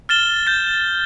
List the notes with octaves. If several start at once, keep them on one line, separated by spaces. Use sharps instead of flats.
F6 A6 E7 G7
G6 A6